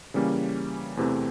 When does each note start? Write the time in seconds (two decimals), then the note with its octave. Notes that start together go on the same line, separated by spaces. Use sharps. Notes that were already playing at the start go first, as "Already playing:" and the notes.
0.14 C#3 E3 G3 A#3 C#4
0.97 E2 C3 E3 A3 C4